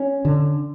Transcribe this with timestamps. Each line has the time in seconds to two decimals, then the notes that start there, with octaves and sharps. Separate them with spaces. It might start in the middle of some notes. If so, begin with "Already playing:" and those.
Already playing: C#4
0.25 D3